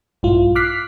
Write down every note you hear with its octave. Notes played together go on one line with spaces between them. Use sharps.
A#1 G2 E4 F4
D6 F6 F#6 B6 C7